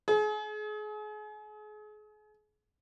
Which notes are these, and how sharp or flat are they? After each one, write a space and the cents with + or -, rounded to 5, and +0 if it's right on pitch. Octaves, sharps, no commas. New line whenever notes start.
G#4 +35